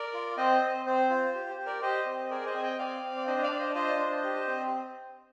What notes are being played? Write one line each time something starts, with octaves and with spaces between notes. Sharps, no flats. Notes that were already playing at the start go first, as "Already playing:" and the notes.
Already playing: A#4 D5
F4
C4 C5 D#5
C4
C4 C5
F4
G4
C5
G4
A#4 D5
G4 C5 D#5
C4
D#5
G#4 A#4 D5
C5 D#5
C4 G#5
D#5 G5
C4 D5 F5
C4
D5
D4 C5 D#5
D5 F5
D4
C5 D#5
F4 C5 D#5
D4
G4
C4